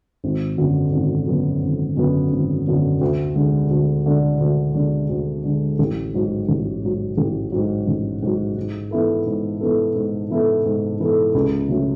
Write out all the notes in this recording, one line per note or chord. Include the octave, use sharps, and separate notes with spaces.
G#1
F#2 D3 F#3 B3
G#1
F#2 D3 F#3 B3
G#1
F#2 D3 F#3 B3
G#1
F#2 D3 F#3 B3
D2
D3 G#3 D4
D2
D3 G#3 D4
D2
D3 G#3 D4
D2
D3 G#3 D4
A1
G#2 F#3
A1
G#2 F#3
A1
G#2 F#3
A1
G#2 F#3
G#2
E3 B3 E4 A4
G#2
E3 B3 E4 A4
G#2
E3 B3 E4 A4
G#2
E3 B3 E4 A4
C#2
C#3 F#3 A3 C#4